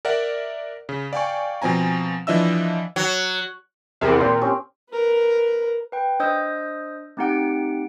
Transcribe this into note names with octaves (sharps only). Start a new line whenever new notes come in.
A#4 D5 E5 F#5
C#3
D5 F5 G5 G#5 C#6
B2 F3 C4 G#5 A#5
E3 F3 D4 D#5 E5 E6
F#3
E2 C3 C4 A#4 B4
A#2 G5 C6
C4 C#4 G4
A#4 B4
B4 G5
D4 C5 D#5 D#6 E6 G6
A3 C4 D#4 G4 F#5 D7